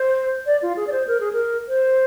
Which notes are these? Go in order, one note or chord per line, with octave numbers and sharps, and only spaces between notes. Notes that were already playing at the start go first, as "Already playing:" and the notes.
Already playing: C5
D5
F4
G#4
D5
C5
A#4
G#4
A#4
C5